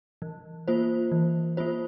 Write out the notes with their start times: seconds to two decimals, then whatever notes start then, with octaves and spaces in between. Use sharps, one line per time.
0.22 E3
0.68 A#3 F4 C5
1.12 E3
1.57 A#3 F4 C5